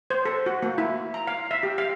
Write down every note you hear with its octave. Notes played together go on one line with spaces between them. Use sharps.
C5
A4
F#4
A#3
E4
A#5
F5
E5
G4
F5